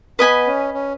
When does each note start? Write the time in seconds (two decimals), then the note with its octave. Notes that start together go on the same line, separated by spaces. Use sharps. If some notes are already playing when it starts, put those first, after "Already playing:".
0.19 B3 B4 D#5 G#5 B5
0.47 C#4
0.74 C#4